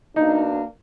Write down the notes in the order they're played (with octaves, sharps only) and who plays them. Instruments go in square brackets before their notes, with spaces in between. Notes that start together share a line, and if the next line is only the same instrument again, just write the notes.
[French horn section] B2 A#3 D4 [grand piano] D#4